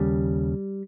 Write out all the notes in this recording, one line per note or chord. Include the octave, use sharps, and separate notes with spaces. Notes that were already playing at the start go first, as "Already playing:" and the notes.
Already playing: D#2 C#3 G3